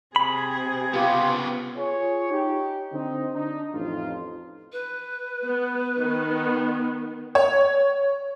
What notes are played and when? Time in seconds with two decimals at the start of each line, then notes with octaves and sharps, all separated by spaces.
0.16 C3 G#4 B5
0.94 C#3 B3 F4 G4
1.76 F4 G#4 C#5
2.30 D#4 G4
2.92 D3 C4 D#4
3.33 D4 D#4
3.73 A1 F2 D#4 F4
4.72 B4
5.45 B3
5.97 D#3 B3
7.35 C#5